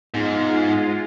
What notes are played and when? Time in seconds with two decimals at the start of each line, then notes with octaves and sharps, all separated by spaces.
0.14 G#2 G#3 B3 D#4 F4